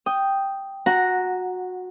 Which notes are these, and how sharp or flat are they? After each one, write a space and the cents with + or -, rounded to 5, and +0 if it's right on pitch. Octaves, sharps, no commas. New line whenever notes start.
G5 +0 D#6 +0
F#4 -20 F#5 -5 A#5 +0